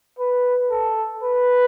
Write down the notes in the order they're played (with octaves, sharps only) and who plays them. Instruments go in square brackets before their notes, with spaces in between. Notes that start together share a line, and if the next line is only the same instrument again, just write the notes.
[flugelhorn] B4
A4
B4